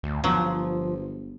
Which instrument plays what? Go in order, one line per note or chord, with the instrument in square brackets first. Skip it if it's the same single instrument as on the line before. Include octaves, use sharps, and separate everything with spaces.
[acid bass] D2
[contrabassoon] G1 [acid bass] F3 [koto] F#3